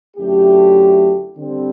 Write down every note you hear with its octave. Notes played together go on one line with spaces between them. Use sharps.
F#2 D3 A3 E4 G4
D3 G3 C4